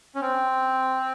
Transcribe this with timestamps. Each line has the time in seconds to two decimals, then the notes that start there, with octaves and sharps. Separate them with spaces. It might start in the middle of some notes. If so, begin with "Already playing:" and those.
0.15 C#4
0.21 C4